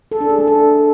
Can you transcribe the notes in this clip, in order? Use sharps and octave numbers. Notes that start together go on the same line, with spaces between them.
A4
D4
G#4
A3
A4